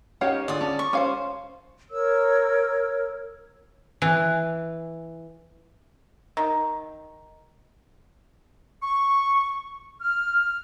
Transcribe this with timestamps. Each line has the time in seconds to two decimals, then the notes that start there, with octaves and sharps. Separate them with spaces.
0.21 C#4 D#4 G4 C#5 F5 F#5
0.48 D3 F4 G#4 D5 D#6
0.61 C#4 A5
0.79 C#6
0.93 C#4 G4 C5 C#5 F5
1.91 A#4 C#5 E6
4.02 E3
6.37 D#3
8.82 C#6
10.00 F6